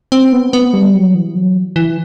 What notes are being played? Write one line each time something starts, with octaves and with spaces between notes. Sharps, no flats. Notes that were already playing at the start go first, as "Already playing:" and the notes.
C4
B3
B3
G3
F#3
E3
F#3
E3